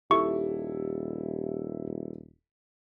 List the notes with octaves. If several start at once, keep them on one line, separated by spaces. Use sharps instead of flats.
D#1 E4 G4 A4 C#6